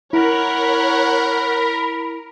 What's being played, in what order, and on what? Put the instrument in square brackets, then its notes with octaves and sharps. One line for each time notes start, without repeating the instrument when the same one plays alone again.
[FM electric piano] E4 [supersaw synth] A#4 [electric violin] C#5 F#5 [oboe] B5